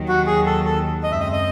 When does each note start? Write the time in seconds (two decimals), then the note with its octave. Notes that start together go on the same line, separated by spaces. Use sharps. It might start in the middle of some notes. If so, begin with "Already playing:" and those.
Already playing: D#2 D#3 F#3
0.09 F#4
0.27 G#4
0.46 A4
0.65 A4
1.03 F#2 C#3 G#3 C4 D#5
1.12 E5
1.20 D#5
1.32 D#5